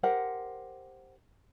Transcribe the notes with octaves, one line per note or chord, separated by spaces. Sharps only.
G4 A#4 C5 F#5